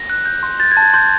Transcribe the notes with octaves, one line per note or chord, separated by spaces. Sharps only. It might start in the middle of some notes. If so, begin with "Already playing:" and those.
Already playing: A#6
F#6
G6
C6
G6 A6
G#6
A5
G#6
C6 G6